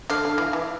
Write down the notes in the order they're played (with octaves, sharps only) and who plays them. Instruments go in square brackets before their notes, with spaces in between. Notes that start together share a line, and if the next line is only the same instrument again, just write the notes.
[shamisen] D3 [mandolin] F5
[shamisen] D3
E3
E3